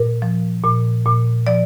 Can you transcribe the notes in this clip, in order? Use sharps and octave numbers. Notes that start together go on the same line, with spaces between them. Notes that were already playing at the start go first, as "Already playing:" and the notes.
Already playing: A#2 A#4
F3
A#2
A#2
F3 D5